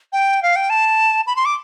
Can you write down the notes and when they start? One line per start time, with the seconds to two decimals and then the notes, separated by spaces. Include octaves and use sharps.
0.13 G5
0.43 F5
0.56 G5
0.70 A5
1.27 B5
1.36 C6
1.45 D6